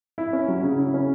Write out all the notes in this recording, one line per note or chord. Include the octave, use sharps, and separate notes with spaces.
E4
C#4
F#3
C#3
E4
C#4